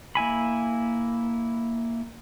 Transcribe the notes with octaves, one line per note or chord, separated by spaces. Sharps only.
A#3 E4 G#5 B5